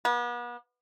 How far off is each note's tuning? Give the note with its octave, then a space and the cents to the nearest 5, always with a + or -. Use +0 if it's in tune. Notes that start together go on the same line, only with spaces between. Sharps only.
B3 -40